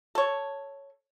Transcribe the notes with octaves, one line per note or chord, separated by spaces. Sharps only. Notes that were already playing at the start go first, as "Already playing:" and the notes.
A4 C#5